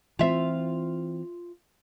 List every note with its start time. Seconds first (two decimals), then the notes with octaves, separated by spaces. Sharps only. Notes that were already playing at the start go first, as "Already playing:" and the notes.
0.19 E3 C4 F4 E5